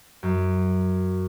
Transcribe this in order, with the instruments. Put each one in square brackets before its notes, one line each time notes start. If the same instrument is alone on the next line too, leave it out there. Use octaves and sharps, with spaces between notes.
[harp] F#2